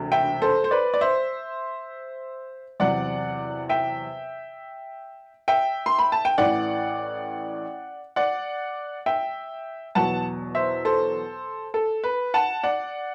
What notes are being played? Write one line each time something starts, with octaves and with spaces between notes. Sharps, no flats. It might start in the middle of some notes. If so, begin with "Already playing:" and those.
Already playing: E1 D2 C3
E5 G5
A4 C5
C5
B4 D5
D5
C5 E5
E2 C3 F#3 D5 F#5
E5 G5
E5 G5
C6
B5
A5
G5
A1 A2 E3 D5 F#5
D5 F#5
E5 G5
E2 B2 F#3 F#5 A5
C5 E5
A4 C5
A4
B4
F#5 A5
D5 F#5